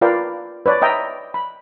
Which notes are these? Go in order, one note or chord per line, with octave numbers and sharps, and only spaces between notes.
F4 A#4 B4 D5 F5 G5
B4 C#5 D5
D#5 E5 G5 A#5
B5